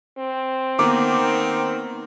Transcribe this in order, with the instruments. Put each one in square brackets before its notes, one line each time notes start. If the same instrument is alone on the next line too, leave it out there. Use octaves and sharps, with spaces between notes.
[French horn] C4
[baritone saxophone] D#3 [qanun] A#3 B3 A#4 [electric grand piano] D6